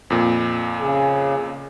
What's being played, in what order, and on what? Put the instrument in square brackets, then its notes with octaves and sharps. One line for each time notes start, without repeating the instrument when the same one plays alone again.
[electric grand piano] F2 A#2
[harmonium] C#3 [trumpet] G#4